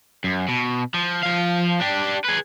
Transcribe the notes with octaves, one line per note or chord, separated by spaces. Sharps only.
F#2
B2
F3
F3 F5
D4 G4
G#4 B4